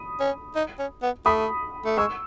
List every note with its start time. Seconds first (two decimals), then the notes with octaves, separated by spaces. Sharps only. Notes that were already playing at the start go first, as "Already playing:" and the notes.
Already playing: B5 D#6
0.20 C#4
0.55 D#4
0.79 C#4
1.02 B3
1.26 A3 B5 D#6
1.85 A3
1.97 G#3 C#6 E6